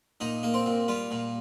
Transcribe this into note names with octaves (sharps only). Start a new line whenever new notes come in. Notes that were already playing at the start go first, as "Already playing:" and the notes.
A#2 D#4
A#3
C4
A#2
G3 F4
A#2